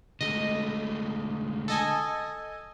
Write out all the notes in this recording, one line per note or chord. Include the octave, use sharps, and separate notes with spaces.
D3 G#3 A3 D#5
A4 D#5 G#5